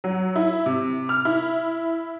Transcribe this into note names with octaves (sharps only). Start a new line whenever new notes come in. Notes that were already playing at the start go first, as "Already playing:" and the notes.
F#3
E4
C3
F6
E4